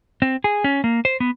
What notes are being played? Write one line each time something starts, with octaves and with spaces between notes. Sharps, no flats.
C4
G#4
C#4
A#3
C5
B3